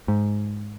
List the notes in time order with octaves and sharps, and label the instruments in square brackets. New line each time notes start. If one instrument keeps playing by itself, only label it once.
[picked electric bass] G#2